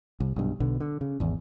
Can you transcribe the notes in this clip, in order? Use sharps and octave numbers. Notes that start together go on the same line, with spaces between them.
C2
B1 G2
B1 B2 D3
D3
C#3
G#1 E2